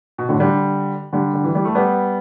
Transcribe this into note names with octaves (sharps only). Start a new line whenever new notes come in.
B2
A2 D3
D3 G3
D3 G3
D3
E3
G3
A3
G3 B3